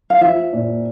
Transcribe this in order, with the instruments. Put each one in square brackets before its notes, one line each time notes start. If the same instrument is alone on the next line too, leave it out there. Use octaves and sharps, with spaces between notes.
[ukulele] F5
[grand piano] F3 [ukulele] E5
[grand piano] A#2